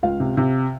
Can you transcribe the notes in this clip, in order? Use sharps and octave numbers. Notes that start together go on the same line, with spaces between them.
C#2 F4 F5
C3
C3